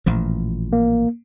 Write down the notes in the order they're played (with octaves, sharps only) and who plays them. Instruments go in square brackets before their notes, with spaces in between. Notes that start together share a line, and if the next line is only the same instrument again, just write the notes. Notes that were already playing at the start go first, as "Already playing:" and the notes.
[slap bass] A1 A#2 F3
[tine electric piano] A#3